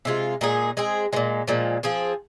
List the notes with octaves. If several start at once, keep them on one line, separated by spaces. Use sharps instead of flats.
C3 G#3 F4
A#2 G#3 D#4 G#4
G#3 C4 G#4
A#2 F3 G#3
A#2 F3 G#3
F3 C4 G#4